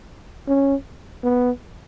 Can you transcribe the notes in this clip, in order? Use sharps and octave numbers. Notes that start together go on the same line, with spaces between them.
C#4
B3